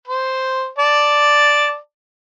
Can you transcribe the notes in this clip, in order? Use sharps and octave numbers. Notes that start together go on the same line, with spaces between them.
C5
D5 A5